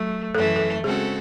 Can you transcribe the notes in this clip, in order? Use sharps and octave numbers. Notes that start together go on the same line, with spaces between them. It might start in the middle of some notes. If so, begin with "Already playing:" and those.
Already playing: F#3 A3
F#2 E3 A3 A4
A4
C#3 G#3 C4 F#4 G#4 A4